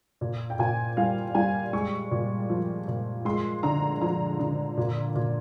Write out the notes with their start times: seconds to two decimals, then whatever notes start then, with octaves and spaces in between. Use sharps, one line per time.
0.21 A#2
0.50 G5
0.59 A#2 G#5
0.97 G3 F5
1.35 G3 G#5
1.73 G#3 C#6
2.11 A#2
2.49 F3
2.88 A#2
3.25 G#3 C6
3.63 D3 A#5
4.01 F3 A#5
4.39 D3
4.77 A#2
5.15 A#2